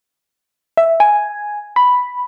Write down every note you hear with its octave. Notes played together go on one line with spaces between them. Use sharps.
E5
G#5
B5